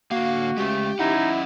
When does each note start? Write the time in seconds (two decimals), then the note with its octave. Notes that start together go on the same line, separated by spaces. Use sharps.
0.11 D3 A#3 F#4 F5
0.58 G#3 A3 C#4 G4
0.99 C#4 D#4 E4 D#5 F#5